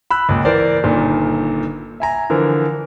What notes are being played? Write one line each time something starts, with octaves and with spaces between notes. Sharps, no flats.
B5 E6 F#6
C#2 A#2
E3 A#4 C5 D5
G1 A#2 D#3
E5 G#5 A#5
D3 E3 F3 A#4